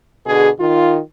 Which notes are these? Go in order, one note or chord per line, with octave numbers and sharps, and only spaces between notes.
B2 D3 G#4
D#3 F4